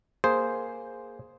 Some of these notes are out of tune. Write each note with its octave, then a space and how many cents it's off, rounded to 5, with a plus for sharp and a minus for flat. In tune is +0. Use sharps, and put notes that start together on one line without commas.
A#3 +0 G#4 +5 C5 +0